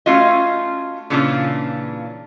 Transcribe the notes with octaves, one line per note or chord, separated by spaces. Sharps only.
A3 C#4 F4 F#4 D#5
A#2 C#3 E3 C#4 D4 F4